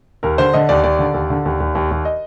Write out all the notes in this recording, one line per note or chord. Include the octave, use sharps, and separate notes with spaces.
D#2 A#4
D3 C5
D3 D#5
D#2 D5
D#2 D5
D3
D#2
D3
D#2
D#2
D#2
D#2
D#5